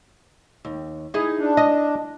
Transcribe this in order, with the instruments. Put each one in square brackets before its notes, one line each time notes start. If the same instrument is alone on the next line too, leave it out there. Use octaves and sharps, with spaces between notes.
[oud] D#2
D#4 E4 G#4
[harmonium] D4
[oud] D#5